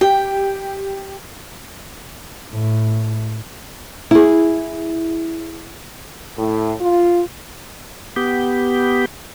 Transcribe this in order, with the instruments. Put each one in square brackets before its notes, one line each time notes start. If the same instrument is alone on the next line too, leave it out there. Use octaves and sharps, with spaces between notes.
[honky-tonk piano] G4 [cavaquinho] G5
[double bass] A2
[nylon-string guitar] E4 G#4
[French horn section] A2
F4
[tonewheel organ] B3 G4